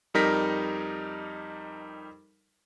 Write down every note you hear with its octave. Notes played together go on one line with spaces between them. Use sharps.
F2 G3 D#4 A#4 A#6 B6